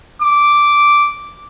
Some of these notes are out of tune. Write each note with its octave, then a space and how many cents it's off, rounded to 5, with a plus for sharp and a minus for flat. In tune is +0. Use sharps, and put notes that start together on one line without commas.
D6 -5